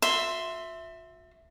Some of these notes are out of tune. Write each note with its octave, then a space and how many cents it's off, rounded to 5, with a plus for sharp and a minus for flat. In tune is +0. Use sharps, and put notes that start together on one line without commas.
F#4 -45 E5 +0 C6 +0